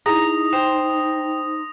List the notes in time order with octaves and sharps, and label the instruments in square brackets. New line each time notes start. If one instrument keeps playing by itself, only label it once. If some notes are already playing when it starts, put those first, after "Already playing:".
[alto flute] D#4 [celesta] E4 G#4 [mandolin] A#5 [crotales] D#6 A#6
[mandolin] C5 [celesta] G5